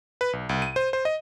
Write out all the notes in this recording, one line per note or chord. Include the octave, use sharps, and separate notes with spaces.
B4
B1
C2
D#7
C5
C5
D#5